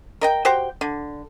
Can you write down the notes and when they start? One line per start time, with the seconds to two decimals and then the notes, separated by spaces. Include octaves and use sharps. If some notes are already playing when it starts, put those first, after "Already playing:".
0.21 A#4 D#5 G5
0.45 F#4 G4 C5 G5
0.81 D3